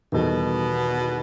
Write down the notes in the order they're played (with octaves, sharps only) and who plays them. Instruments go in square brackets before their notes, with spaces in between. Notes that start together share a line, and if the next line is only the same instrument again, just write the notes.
[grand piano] E2 D#3 G3 D#4 A4 [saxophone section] B2